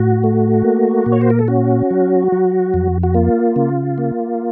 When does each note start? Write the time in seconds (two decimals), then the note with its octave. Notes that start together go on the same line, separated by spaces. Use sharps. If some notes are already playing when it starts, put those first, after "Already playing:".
Already playing: A2 F#4
0.24 A3
0.65 A#3
1.06 A#2
1.12 C#5
1.21 C5
1.30 A#4
1.39 A4
1.48 C#4 F#4
1.91 F#3
2.32 F#3
2.74 F2
3.03 F#4
3.14 A#3 F4
3.56 C#3
3.98 A#3